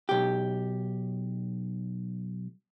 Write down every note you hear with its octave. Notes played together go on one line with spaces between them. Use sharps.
B1 G4